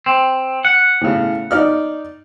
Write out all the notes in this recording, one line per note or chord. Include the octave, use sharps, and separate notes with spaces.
C4
F#5
A2 C#3
D#4 D5 F6